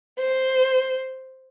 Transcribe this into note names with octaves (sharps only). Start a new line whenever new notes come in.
C5